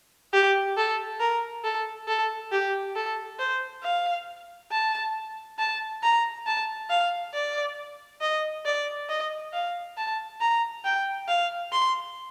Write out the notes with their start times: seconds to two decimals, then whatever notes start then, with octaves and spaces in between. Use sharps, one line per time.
0.33 G4
0.77 A4
1.20 A#4
1.64 A4
2.08 A4
2.52 G4
2.96 A4
3.39 C5
3.83 F5
4.72 A5
5.59 A5
6.03 A#5
6.47 A5
6.90 F5
7.34 D5
8.22 D#5
8.65 D5
9.09 D#5
9.53 F5
9.97 A5
10.41 A#5
10.85 G5
11.28 F5
11.72 C6